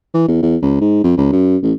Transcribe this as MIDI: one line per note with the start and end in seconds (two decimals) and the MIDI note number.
0.14 0.24 52
0.28 0.39 40
0.42 0.56 40
0.62 0.80 37
0.81 1.01 44
1.04 1.13 41
1.17 1.30 37
1.32 1.57 42
1.63 1.73 33